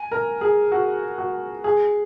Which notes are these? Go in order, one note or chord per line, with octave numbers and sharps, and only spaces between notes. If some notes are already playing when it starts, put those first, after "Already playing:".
Already playing: G#5
A#4
G#4
F#4
F#4
G#4